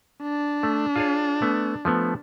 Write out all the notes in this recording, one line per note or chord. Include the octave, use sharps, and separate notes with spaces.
D4
A3
F4 G#4 C#5
A3 B3
F3 A3 B3